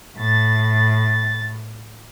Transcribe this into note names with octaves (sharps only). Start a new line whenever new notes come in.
A2 A6